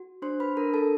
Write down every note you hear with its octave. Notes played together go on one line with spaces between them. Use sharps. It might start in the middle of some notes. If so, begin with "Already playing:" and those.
Already playing: F#4
D4 C5 C6
B4 B5
D4 A#4 A#5
A4 A5